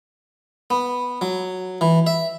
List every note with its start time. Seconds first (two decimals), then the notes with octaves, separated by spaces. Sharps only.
0.70 B3
1.21 F#3
1.81 E3
2.07 E5